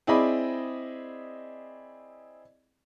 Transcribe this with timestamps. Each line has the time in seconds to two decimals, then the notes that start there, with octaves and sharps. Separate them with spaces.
0.07 C4 E4 G#4 D5 D#5 B5